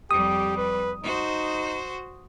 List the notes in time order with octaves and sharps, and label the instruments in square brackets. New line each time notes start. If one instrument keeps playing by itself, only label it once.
[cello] F2 G3 [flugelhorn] G4 [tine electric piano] D#6
[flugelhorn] B4
[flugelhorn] D#4 [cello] F#4 C5